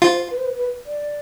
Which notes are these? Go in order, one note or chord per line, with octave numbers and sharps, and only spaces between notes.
F4 C5
B4
C5
B4
B4
D5